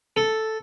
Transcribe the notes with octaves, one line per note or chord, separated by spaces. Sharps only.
A4